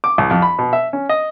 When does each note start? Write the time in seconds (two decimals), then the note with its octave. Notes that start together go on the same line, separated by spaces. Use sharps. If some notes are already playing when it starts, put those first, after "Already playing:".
0.04 D6
0.18 C2
0.31 F2
0.42 B5
0.59 B2
0.73 E5
0.93 C#4
1.09 D#5